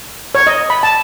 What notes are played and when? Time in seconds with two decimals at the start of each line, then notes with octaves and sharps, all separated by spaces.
0.35 C#5
0.47 D#5
0.70 B5
0.83 A5